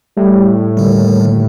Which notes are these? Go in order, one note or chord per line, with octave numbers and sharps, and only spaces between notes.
A2 G3
D#2 D3 G3